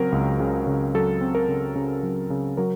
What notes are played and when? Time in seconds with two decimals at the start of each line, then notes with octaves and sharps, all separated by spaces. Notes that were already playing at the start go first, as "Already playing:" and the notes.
Already playing: C#3 F#3 C4 A#4
0.12 C#2
0.40 C#3
0.67 C#3
0.94 F#3 A4
1.21 C4
1.35 A#4
1.48 C#3
1.76 C#3
2.03 F#3
2.30 C#3
2.57 F#3 A#4